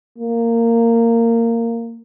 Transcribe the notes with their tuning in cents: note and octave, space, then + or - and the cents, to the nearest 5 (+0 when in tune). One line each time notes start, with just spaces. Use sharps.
A#3 -15